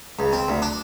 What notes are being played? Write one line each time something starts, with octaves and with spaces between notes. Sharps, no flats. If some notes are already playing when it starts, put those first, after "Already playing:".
C#2
C4
D2
D4